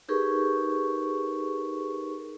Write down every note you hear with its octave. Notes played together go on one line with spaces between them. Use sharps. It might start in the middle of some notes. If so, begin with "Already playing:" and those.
D#4 G4 G#4 A#4 B4 C#6